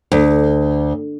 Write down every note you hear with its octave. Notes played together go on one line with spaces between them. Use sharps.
D2